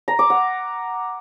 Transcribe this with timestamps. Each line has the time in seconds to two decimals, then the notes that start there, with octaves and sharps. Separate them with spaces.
0.08 A#5
0.19 D6
0.30 F#5